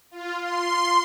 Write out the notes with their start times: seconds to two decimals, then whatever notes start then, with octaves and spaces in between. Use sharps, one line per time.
0.11 F4
0.41 C6